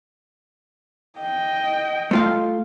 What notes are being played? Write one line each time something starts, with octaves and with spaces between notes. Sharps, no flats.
D#5 G5
A3 F4 F5